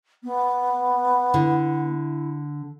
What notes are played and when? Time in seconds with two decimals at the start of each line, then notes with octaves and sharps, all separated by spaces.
0.23 B3
1.34 D3 E4